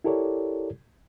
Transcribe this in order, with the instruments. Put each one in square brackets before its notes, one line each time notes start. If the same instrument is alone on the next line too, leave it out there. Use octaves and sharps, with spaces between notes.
[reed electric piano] E4 G4 A4 A#4 C#5 D5